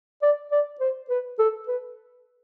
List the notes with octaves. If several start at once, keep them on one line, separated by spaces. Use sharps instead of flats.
D5
D5
C5
B4
A4
B4